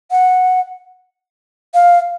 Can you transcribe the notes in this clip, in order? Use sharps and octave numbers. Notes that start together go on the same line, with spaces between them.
F#5
F5